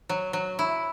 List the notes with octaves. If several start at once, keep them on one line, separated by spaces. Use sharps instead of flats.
F#3
F#3
E4